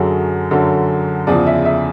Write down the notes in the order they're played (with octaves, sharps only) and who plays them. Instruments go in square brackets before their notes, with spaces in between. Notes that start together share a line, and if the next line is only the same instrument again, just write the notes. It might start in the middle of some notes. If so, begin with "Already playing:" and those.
Already playing: [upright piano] F#2 D3 F#3 G#4
F#2 D3 F#3
E2 C#3 F3 D5
E5
E5